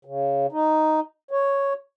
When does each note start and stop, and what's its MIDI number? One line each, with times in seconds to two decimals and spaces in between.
0.05 0.47 49
0.52 1.00 63
1.31 1.73 73